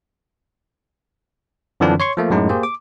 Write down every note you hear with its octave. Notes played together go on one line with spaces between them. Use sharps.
F#2 D3 E3 F3 C4 D4
C#5 C6 C#6
F3 A3 A#3
F#2 A2 G#3 D#4
A#3 G4 G#4 C5
D6